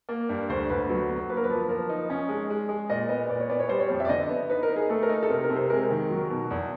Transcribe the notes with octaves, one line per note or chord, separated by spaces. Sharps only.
A#3
G2
D2 C5
D2 B4
F#3
B3
A#3 B4
A#4
B4
F3
F3 A#4
D#4
C#4
G#3
G#3
G#3
A#2 D#5
B3 D#5
A#2 D5
C#5
B3 D5
C#5
G3 C5
C#5
F2
E5
D5
D3 D#5
B3
D#4 B4
A#4
D#4
G#4
A3 A4
A#4
D#4
A4
C3 A#4
A#4
C3
C5
G#3 A#4
D#3
F#3
B2
E2